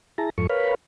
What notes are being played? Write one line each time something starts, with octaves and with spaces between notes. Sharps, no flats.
E4 G#4 A5 A#5
F2 G#2 F3 A4 C#6
A#4 B4 C#5 F5 B5